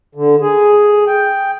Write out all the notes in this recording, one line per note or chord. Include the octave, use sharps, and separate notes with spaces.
D3
G#4
G5